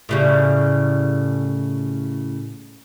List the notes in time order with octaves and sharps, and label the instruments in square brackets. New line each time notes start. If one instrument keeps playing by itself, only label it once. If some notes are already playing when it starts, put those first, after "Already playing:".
[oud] A2 C#3 G3